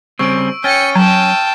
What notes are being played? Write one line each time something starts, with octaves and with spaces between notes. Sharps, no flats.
C#3 G3 C4 C#6 E6 D7
C#4 G5 F6 A6 C#7 D#7
F#3 G5 A5